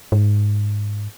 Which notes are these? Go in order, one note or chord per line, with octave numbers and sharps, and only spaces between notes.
G#2